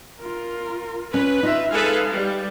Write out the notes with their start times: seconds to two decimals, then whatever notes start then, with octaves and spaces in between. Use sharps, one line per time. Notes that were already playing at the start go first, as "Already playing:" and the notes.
0.20 F4 A#4
1.14 C#4 B4
1.43 D#4 F4 E5
1.72 G#3 G#4 A4 B4 F5
2.10 G3